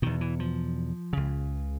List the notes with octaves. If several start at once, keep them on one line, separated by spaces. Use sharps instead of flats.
E2 B2 D#3
E3
F3
C#2 C#3